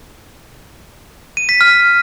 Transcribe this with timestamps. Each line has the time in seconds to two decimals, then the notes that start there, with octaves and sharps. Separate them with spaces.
1.37 D#7
1.49 B6
1.61 F6